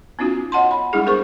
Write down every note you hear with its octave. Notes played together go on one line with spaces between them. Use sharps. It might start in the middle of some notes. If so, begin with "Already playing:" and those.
B3 C#4 D#4 F4 F#4
C#5 D#5 F#5 A5 C6
B5
G3 G#3 D4 E4 G#4 F#5
B3 G#4 A#4 C5 C#6